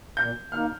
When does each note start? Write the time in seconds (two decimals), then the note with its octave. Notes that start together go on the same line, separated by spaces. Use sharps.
0.16 A#2 G6
0.52 A#3 D#4 F6